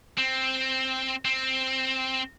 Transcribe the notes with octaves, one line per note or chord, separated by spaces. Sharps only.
C4
C4